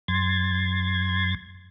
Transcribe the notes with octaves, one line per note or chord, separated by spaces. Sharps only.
F#2 C6 G#6 A6